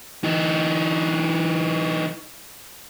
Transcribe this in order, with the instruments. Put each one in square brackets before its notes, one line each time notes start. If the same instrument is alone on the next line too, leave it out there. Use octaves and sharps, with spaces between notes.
[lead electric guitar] E3 D#4